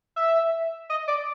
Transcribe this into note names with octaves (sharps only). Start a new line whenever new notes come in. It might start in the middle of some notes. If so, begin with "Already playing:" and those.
E5
D#5
D5